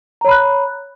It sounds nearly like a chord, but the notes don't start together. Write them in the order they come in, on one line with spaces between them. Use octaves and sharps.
A#5 C#5 B5 F#6